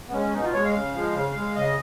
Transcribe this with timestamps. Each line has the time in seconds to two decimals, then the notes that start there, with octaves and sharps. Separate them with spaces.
0.09 B3
0.13 G#3 C#4
0.33 B2 D#4
0.43 F4
0.54 G#3 C#5
0.65 F5
0.74 C#3
0.94 F3 G#3
1.14 C#3
1.36 G#3
1.55 C#3 D#5